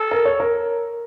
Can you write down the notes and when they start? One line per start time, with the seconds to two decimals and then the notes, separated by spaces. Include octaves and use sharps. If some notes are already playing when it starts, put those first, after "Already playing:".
Already playing: A4
0.11 A#4
0.25 C#5
0.40 A#4